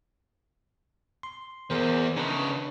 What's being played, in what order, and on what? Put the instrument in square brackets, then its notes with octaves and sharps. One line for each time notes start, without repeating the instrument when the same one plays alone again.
[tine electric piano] C6
[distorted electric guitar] E2 [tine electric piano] G#4 A#4 C5
[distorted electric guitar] C#3 D#4 [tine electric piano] D4 B4